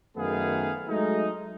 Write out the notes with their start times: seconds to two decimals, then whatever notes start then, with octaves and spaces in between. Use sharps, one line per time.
0.17 F#2 D#3 A3 B3 G#4 F5
0.89 F#3 G#3 A3 D#4